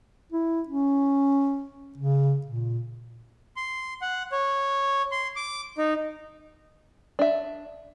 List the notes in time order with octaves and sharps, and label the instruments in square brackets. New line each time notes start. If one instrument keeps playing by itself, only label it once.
[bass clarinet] E4
C#4
C#3
A#2
[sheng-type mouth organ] C6
F#5
C#5
C6
D6
D#4
[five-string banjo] D4 E5